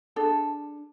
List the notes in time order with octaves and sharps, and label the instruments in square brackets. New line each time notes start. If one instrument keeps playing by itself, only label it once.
[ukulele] D4 G#4 A4